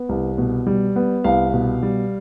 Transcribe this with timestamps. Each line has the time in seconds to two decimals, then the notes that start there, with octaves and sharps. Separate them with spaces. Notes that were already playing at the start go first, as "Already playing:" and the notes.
Already playing: B3
0.09 C2
0.38 B2
0.67 G3
0.96 B3
1.24 C2 F5
1.54 B2
1.83 G3